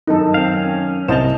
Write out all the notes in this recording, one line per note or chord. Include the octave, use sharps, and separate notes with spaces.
F#2 D#3 D#4 A4
C4 F5
C#4
C2 C5 D#5 A5 E7 F7